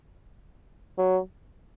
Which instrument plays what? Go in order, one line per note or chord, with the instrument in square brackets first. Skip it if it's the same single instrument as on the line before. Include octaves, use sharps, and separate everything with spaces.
[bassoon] F#3